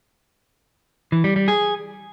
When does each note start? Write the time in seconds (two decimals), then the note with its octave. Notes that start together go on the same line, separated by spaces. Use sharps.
1.12 E3
1.24 G3
1.36 G3
1.48 G#4